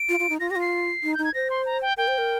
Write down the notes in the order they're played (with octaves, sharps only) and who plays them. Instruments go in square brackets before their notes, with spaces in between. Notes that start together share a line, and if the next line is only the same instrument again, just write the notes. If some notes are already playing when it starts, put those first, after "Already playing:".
Already playing: [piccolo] D7
[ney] F4
F4
D#4
[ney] F4 [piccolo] A#6
[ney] G4 [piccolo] A#6
[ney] F4
[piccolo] C7
[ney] D#4
[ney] D#4 [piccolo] G6
[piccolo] G#6
[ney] C5 [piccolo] A#6
[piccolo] C6
A#5
G5
[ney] A#4 [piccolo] G5
[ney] C5
A#4